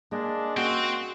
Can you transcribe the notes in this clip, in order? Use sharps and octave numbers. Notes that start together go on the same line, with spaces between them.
G#3 A#3 D4
A#3 C4 C#4 F#4